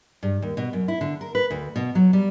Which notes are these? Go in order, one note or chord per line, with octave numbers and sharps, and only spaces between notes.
G2
D#2
B2
F#2
E4
D3
A#4
B4
D2
B2
F#3
G3